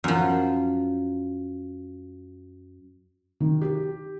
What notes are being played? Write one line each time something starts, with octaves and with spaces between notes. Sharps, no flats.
F#2 F3
D#3
G4